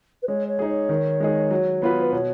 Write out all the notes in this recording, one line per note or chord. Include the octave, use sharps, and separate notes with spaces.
B4
G#3 C#5
C#5
D#4 G#4
C#5
D#3
G#3 D#4 G#4
F#3
B3 F4 B4
B4
B2 C#5